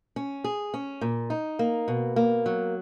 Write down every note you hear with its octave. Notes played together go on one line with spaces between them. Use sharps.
C#4
G#4
C#4
A#2
D#4
A#3
B2
A#3
F#3